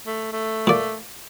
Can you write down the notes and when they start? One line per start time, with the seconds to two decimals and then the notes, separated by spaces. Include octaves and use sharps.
0.07 A3
0.33 A3
0.67 A#2 D5